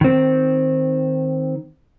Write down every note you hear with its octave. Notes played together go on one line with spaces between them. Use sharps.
D#3 C4